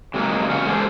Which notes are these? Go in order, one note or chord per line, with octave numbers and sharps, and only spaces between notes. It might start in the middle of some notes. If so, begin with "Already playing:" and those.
C3 F#3 G#3 A#3 D#4
E2 C#3 F#4 F5
G#3 A#3 C#4 G4 A4 C5